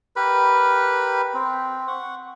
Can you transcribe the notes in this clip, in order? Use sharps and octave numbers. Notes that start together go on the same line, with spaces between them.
G4 A#4 B4 B5
C4
F#5 C#6